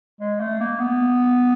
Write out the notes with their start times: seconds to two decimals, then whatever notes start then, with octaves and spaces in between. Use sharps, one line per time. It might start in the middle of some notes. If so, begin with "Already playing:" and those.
0.20 G#3
0.40 A3
0.60 A#3
0.79 B3